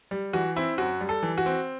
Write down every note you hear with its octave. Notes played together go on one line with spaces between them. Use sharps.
G3
E3 F#4
C4 E4
F#2 F#4
G3
A4
E3
F#4
C4